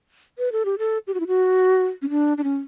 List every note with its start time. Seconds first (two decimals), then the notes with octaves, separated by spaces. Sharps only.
0.38 B4
0.52 A4
0.65 G4
0.78 A4
1.07 G4
1.14 F#4
1.20 E4
1.27 F#4
2.02 C#4
2.10 D4
2.38 D4
2.44 C#4